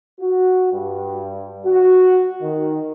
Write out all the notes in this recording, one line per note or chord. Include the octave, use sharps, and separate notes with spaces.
F#4
G2
F#4
D#3